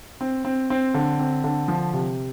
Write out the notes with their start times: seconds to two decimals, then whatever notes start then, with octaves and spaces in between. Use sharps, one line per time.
0.21 C4
0.45 C4
0.70 C4
0.94 D3
1.19 C4
1.44 D3
1.68 F3
1.93 C3